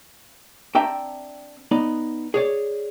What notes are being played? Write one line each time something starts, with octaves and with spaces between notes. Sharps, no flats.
C4 D4 E5 G5 A5 A#5
B3 D#4 D5
G#4 C#5 D5